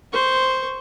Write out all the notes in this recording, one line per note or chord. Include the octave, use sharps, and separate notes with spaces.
C5 C#6